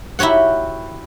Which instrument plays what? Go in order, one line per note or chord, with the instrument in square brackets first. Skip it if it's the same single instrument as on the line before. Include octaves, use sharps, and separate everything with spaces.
[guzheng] E4 F#4 G4 C#5 F#5